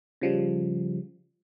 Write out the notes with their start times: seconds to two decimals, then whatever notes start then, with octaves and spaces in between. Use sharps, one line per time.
0.21 C#3 F3 G3